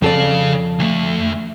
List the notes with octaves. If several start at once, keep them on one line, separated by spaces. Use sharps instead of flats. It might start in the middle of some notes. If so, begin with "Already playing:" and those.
F2 C#3 A4 D5 F5
D2 A3